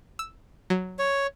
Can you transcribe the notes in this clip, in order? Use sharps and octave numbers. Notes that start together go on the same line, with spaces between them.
E6
F#3
C#5